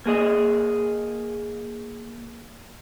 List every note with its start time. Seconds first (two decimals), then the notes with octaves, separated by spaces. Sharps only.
0.06 A#3 G#4 D#5